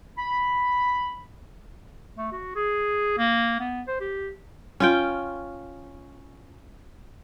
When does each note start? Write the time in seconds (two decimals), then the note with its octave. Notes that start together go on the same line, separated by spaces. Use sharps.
0.18 B5
2.17 A3
2.32 F#4
2.56 G#4
3.18 A#3
3.60 B3
3.87 C5
4.01 G4
4.80 C#4 F4 G5